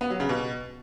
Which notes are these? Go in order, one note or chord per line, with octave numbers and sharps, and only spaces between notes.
B3
F#3
C#3
B2